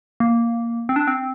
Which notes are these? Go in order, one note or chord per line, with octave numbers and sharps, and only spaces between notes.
A#3
C4
D4
C4